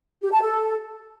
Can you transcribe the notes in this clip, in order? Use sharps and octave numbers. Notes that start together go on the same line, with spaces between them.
G4
A5
A4